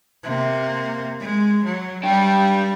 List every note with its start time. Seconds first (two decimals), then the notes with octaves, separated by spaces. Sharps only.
0.23 C3 A#3
1.20 G#3
1.65 F#3
2.03 G3 D4 G4